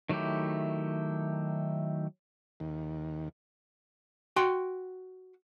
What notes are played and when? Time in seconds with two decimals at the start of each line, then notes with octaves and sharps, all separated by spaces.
0.09 D#3 F#3 A3 E4 G4
2.60 D#2
4.36 F#4 G5 C6